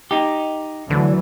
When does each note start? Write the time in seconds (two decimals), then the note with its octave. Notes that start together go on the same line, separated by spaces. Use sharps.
0.11 D#4 G4
0.90 D2 D3 E3 F#3